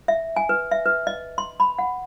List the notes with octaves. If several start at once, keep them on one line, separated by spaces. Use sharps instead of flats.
E5
G#5
B4
E5
B4
D#5
C6
B5
F#5